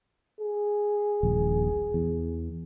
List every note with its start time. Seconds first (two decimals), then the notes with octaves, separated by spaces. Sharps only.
0.40 G#4
1.23 D#1 A#1
1.94 E2